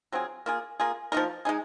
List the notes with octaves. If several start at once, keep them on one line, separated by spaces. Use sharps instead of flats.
F#3 C4 F4 G#4
A#3 F4 G#4
A#3 F4 G#4
F3 A#3 D#4 A#4
G#3 D#4 G#4